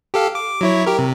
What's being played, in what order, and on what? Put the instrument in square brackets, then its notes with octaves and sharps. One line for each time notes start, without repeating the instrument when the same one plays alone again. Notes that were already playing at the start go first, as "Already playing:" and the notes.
[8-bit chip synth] G4 A4 F5
D6
F#3 E4 C#5
G4 A#4
C3